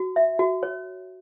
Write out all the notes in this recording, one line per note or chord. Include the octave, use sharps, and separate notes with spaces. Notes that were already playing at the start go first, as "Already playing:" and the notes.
Already playing: F#4
E5
F#4
C#5